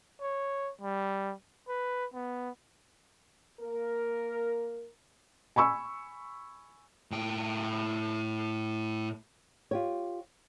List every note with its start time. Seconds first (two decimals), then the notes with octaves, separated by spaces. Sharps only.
0.20 C#5
0.81 G3
1.68 B4
2.13 B3
3.61 A#3 A#4
5.56 G#5 B5 C#6 E6
7.11 A2 G5
9.71 F4 G4 C#5